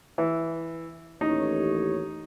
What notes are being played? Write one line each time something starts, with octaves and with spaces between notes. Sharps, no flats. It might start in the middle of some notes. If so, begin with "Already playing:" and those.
E3
A1 D#2 D#4 C#5